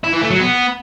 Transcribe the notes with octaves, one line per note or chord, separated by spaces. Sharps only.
E4
E3
A3
F#3
B3